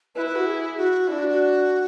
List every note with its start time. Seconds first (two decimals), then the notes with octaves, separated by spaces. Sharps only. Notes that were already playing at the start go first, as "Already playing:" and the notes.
0.15 E4 B4
0.26 B4
0.36 F#4
0.46 G#4
0.77 F#4
1.08 D4 E4
1.19 F#4
1.29 F#4